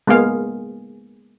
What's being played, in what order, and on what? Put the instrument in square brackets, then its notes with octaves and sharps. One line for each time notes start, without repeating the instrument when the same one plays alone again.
[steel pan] G#3 A#3 B3 G#4 F5